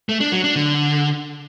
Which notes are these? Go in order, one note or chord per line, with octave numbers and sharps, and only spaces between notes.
A3
D4
F#3
D4
D3